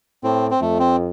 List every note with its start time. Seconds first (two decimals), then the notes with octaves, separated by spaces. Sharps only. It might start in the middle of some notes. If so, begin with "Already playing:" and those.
0.24 A2 C4
0.51 C4
0.61 F2 A3
0.80 C4